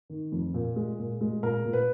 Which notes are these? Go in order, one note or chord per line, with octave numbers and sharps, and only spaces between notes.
D#3
F2
A#2
G#3
A#2
G#3
A#2 A#4
A#2
B4